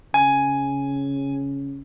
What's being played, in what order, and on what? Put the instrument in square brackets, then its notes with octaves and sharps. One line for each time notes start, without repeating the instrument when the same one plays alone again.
[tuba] C#3 [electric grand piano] G#5